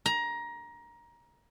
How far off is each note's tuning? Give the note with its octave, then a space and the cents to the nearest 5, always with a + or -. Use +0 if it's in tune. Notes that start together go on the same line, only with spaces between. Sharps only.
A#5 +20